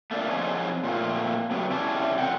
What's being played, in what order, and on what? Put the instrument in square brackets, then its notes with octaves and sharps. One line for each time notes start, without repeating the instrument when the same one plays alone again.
[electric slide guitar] A3 A#3 D4 D5
F3 C4 D#4 G#4 C#5 D#5
A#2 F3 F#3 A3 A#3 C4
C3 F#3 B3
C3 C#4 E4 G#4 D5 A5
F2 C4 A#4 D5 F#5 G5